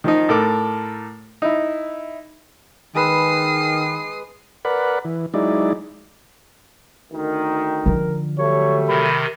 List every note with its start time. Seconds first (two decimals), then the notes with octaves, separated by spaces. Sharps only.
0.04 D#3 F3 D#4
0.29 A2 A4 A#4 D6
1.42 D#4 E4
2.95 D#3 G#3 B4 D#6 E6 C7
4.65 A#4 B4 D5 F#5 B5
5.05 E3
5.34 F#3 G#3 D#4 E4 D5
7.13 D2 D#3
7.86 D3 F3 A#4
8.38 F#3 G3 A3 C#5
8.88 C3 D#3 B5